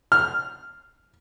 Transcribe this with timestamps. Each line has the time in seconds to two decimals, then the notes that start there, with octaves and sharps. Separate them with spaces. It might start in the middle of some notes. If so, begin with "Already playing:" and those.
0.12 F6